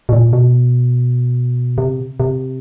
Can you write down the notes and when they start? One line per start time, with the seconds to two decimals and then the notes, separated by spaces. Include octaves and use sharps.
0.09 B2
0.13 A#2
0.33 B2
1.78 C3
2.20 C3